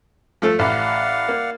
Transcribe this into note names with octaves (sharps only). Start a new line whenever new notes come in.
F3 A3 A4
A1 D5 F5 F#5
A#3